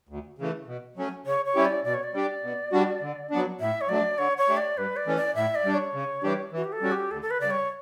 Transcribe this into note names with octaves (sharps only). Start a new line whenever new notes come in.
D2
C#3 E3 A3
B2
F#3 A3 C#4
C#3 C#5
C#5
G3 C#4 E4 G4
D5
B2 D5
C#5
D5
G3 D4 G4
B2
G3 D4 F#4
D3
F#3 B3 D4
A2 E5
C#5
F#3 A3 D4 D5
D3 C#5
C#5
A3 D4 G4
D5
G2 B4
D5
E3 A3 C#4
D5
A2 E5
D5
G3 D4
C#5
C#3
E3 G3 D4 G4
E3 F#4
G4
A4
G3 C#4 F#4
G4
D2 A4
A4
B4
C#3 G3 D5
C#5